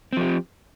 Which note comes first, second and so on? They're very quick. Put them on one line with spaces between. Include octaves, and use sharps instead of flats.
C4 F3 G4